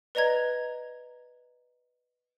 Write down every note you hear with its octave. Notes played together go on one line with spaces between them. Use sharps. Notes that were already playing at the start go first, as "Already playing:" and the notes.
B4 D5 D#5 A#5 G#6